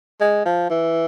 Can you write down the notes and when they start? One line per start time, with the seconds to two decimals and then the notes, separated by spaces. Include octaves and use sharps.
0.20 G#3
0.45 F3
0.70 E3